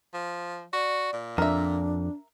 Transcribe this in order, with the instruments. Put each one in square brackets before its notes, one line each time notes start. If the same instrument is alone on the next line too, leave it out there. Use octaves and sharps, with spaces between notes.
[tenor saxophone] F3
[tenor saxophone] F#4 [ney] D5
[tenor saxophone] A#2
[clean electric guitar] F2 [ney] D4 [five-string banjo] A#4 E5